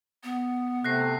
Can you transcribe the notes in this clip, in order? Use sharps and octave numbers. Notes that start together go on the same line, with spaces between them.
B3
C3 A3 F#6 A#6 C7